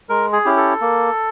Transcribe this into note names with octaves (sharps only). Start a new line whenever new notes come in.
G#3 A#4
G#4
C#4 E4 G4
A4
A#3